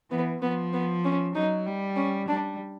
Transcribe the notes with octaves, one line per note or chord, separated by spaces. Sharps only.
E3 B3
F3 B3
B3
C#4
F#3 D#4
G3
C#4
G3 D4